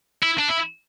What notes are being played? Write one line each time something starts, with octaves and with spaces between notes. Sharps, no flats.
E4
D4
E4